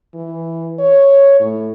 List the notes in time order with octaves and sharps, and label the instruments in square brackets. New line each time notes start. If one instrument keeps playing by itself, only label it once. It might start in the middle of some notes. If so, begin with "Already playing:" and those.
[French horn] E3
C#5
A2